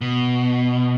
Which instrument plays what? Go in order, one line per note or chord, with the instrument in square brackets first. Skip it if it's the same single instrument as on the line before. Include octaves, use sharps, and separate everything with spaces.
[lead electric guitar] B2